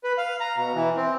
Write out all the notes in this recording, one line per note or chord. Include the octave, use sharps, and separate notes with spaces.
B4
F5
A#5
B2
E3
C4